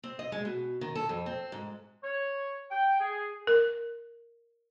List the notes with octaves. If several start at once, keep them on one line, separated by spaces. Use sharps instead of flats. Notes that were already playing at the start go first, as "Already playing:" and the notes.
C4
D#5
G#3
B2
D#3
A4
F2
C4
G#2
C#5
G5
G#4
A#4